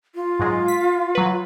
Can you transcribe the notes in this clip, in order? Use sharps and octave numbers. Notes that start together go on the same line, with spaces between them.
F4
G#2 F#3 G#3
B6
F#3 B4